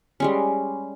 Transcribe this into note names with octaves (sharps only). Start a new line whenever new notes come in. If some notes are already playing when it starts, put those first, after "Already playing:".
G3 G#3 C#4